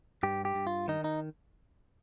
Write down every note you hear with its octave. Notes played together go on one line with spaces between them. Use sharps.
G2 G4
G4
G2
F4
D#3 D#4
D#4